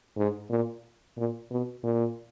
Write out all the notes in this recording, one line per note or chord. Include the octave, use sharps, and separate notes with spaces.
G#2
A#2
A#2
B2
A#2